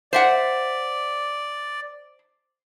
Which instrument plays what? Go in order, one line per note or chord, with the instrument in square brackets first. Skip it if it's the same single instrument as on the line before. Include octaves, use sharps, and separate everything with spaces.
[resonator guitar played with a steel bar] C5 E5 F#5 [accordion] D5